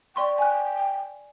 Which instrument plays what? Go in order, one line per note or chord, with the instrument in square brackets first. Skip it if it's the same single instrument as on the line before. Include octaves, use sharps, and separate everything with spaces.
[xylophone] D5 C6 C#6 [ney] G5
[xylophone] G#5 F#6